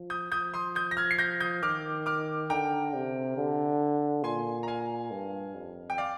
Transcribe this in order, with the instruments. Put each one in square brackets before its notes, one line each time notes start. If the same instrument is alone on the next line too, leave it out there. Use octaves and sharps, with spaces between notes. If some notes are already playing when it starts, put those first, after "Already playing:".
Already playing: [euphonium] F3
[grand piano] D#6 G6
[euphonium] F3 [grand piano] D#6 G6
[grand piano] C6 D#6
D#6 G6
A#6
F6 G#6
C7
G6 A#6
D#6 G6
[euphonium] D#3 [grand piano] D6 F6
[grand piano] D6 F6
[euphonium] D3 [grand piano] G5 A#5
[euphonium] C3
D3
[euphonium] A#2 [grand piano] G#5 C6
[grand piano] A#5
F5 G#5
[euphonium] G2
F2
[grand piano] G5
D5 F5